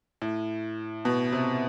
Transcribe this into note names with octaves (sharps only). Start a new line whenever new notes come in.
A2
B2
C3